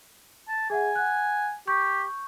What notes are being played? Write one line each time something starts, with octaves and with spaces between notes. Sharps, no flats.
A5
G#4 E5 F#5 G#5
F#5 F#6
G4 C#6 G6